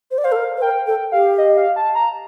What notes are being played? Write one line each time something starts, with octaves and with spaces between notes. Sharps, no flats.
C5
D5
C5 F5
A4
A#4
C5
A#4 G5
A4 G5
G4 F5
D#5
F5
A5
A#5